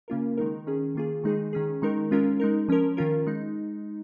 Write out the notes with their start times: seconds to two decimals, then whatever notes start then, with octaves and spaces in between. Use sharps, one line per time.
0.08 C#3 A#3 C#4 F4 A#4
0.38 D#3 G#3 D#4 A#4
0.67 D#3 C#4 G#4
0.95 D#3 A#3 F4 G#4
1.24 D#3 G#3 D#4 G#4
1.53 D#3 C#4 G#4
1.82 D#3 G#3 D#4 A#4
2.11 G#3 C#4 F4 A#4
2.40 G#3 D#4 A#4
2.68 F3 C#4 A#4
2.97 D#3 C#4 F4 A#4
3.27 G#3 D#4